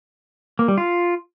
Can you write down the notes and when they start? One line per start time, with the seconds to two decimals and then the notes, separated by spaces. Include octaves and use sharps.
0.59 A#3
0.68 G3
0.78 F4